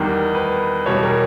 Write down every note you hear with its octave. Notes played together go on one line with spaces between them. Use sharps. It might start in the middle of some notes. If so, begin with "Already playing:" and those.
Already playing: E2 D#3 G3 A#4
B4
E2 B2 G3 C#5
A#4